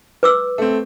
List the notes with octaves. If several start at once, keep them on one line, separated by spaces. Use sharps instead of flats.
B4 D6 E6
A3 C4